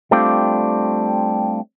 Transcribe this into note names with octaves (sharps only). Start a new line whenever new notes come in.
G3 A3 C4 D4 F4 G4